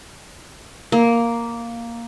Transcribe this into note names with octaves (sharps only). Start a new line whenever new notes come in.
A#3